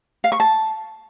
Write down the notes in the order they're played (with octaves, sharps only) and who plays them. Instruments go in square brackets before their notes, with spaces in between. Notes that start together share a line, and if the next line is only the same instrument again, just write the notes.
[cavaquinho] F5
C#6
A5